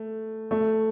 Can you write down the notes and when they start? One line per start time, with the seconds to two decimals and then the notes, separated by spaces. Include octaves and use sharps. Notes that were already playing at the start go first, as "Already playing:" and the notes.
Already playing: A3
0.51 A3